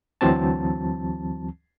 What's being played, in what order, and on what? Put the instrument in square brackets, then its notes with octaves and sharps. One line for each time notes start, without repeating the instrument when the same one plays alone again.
[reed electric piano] D2 E3 F#3 C4 A5